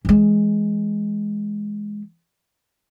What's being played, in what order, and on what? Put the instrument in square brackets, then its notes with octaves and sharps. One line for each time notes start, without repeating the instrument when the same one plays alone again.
[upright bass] E3 G#3